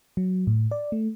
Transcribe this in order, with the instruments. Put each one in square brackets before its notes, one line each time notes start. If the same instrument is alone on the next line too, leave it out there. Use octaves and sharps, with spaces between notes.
[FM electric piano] F#3
A2
D5
A3